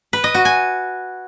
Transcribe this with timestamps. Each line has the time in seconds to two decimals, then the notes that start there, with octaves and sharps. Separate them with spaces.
0.13 B4
0.24 D#5
0.34 F#4
0.45 G#5